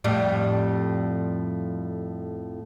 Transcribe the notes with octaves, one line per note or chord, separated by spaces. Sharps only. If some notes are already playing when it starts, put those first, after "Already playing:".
F2 A2 G3